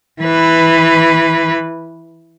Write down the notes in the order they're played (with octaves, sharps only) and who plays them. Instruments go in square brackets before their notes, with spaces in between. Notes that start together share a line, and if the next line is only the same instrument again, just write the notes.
[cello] E3 B4